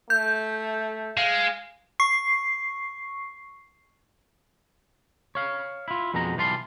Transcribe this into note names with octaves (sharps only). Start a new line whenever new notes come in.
A3 G6
G#3 F5
C#6 C7
C#5 F5
E4 F4
F2 B2 G#3 D#4 A#5
B1 E3 G3 F4 A5 C6